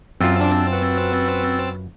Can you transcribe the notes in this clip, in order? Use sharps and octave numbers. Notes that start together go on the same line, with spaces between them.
F#2 C4 F4 E6 A6
D4
C#4 F#4 B4